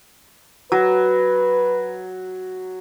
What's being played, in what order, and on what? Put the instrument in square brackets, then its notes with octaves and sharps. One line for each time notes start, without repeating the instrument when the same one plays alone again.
[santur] F#3 [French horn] B4